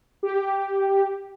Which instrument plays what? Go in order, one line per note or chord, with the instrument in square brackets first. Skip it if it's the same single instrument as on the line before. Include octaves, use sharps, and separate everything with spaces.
[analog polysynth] G4